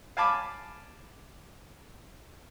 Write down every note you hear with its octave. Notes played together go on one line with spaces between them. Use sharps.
F5 G#5 A5 B5 D6